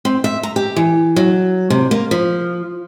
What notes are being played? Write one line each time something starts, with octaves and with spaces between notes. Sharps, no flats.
C4
E5
A#5
G4
E3
F#3
C3
A#3
F3